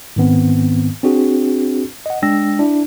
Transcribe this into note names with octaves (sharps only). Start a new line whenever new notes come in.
G#2 D#3 B3 C4
C4 D4 F#4 G#4
D#5 F#5
G#3 D4 G5 E6 A#6
D4 E4